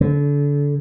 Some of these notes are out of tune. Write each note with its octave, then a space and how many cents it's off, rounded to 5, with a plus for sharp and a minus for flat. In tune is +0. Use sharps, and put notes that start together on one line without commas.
D3 -30